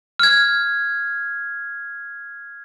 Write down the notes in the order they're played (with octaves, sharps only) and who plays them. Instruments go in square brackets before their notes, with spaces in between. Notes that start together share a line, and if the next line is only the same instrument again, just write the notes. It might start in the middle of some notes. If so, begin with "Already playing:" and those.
[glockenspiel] F6 G#6